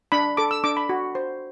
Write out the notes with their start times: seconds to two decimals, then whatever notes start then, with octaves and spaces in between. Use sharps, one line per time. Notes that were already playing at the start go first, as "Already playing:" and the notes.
0.12 D4 B5
0.37 A4 D6
0.51 E6
0.64 D4 D6
0.77 B5
0.89 F#4
1.15 C5